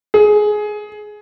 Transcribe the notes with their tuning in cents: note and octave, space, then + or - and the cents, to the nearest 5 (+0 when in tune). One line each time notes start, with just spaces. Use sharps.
G#4 +15